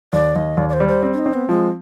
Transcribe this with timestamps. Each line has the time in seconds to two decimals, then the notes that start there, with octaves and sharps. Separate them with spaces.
0.13 D#2 D5
0.36 D#2 D#5
0.57 D#2 D5
0.69 D5
0.73 C5
0.80 G3
0.88 C5
1.03 C4
1.13 D4
1.18 D#4
1.26 C4
1.34 B3
1.49 F3 G#3